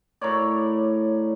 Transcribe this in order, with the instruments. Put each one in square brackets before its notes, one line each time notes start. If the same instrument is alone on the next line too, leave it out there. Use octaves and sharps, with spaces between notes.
[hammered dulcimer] A2 A#4 C#5 D5